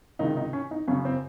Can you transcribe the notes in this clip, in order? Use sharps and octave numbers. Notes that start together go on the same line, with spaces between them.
C#2 C3 D#3 D#4
D#4
C#4
D#4
F#2 C#3 C#4
C4